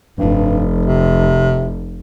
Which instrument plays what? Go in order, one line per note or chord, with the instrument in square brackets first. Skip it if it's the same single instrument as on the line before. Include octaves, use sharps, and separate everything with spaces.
[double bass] F1 [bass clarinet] G2
[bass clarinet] C3